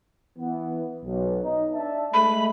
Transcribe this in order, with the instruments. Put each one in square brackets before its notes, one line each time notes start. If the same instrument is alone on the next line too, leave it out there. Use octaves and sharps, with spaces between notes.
[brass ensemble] E3 B3
B1
D#4
D4 E5 A5
[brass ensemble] G#3 A3 [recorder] B5